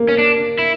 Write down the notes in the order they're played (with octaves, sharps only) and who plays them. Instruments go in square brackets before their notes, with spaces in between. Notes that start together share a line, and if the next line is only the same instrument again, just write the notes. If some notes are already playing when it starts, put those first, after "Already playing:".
Already playing: [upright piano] A#3
[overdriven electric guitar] C#4
D4
E4